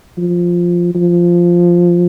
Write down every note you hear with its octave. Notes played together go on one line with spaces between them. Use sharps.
F3
F3